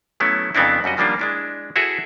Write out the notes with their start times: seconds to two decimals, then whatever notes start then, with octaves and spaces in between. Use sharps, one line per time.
0.20 F#3 A3 B3 C#4 E4
0.55 F2 C#3 B3 C4 D4 E4
0.84 F#2 G3 F#4 D#5
0.97 D#3 F3 G3 A#3 D4 F4
1.19 G#3 D4 E4
1.76 E4 F#4 G#4 A4 B4 E5